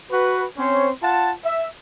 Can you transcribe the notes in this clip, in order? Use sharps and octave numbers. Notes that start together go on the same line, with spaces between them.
F#4 B4
C4 C#4 C5 C#5
F4 F#5 A5
E5